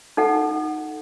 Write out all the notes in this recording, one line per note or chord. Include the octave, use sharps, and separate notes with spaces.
D#4 A4 F#5